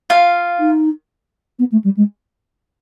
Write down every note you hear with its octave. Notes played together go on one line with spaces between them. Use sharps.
F4 F5
D#4
B3
A3
G3
G#3